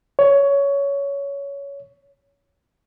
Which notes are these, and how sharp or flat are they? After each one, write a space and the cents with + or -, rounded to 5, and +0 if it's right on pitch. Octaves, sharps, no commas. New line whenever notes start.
C#5 +15